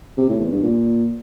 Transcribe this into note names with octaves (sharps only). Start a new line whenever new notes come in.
C3
A2
E2
G2
A#2